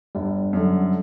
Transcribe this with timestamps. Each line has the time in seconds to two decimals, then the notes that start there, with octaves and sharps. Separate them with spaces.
0.15 G1 G3
0.53 F#2 D3